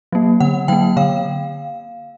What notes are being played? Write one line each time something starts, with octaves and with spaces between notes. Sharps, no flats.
F#3 A#3
D3 F#5
F#3 A#3 G5
D3 F5